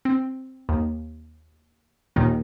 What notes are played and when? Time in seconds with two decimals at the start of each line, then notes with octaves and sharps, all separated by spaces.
0.05 C4
0.69 D#2
2.16 D#2 A#2 D#3